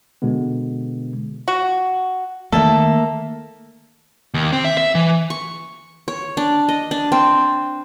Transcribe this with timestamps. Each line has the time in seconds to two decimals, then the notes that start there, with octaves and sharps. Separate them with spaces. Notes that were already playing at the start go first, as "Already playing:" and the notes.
0.22 B2 D3 G#3 B3
1.48 F#4
2.52 D#3 A3 A#3 A4 A#4 E5
4.34 D#2
4.53 C4
4.64 E5
4.77 E5
4.95 E3
5.30 C#6
6.08 C#5
6.37 D4
6.69 D#5
6.91 D4
7.12 C4